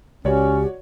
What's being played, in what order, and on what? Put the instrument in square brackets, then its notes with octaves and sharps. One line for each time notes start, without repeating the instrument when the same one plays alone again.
[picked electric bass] C#2 [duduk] C#4 [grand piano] F#4 C#5 D5 [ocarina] G4